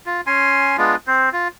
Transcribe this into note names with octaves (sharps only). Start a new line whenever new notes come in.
F4
C#4 G#5 C6
G#3 B3 D4 F4
C4 C5
F4